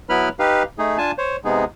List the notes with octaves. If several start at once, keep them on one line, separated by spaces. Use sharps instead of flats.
F#3 B3 E4 B4 B5 F6
D#4 G4 B4 F5
A3 D#4 G#4
D4 F4 G#5 A5
C5 C#5
C3 G#3 B3 D#4 G#4